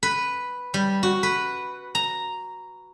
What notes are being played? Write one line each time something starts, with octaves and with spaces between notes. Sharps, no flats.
B4
G3
F#4
B4
A#5